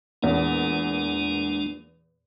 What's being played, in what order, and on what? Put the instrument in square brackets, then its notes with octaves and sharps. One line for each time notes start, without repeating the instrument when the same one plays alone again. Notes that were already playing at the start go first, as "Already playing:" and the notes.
[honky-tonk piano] E2 A#2 [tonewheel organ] G#3 A#3 D4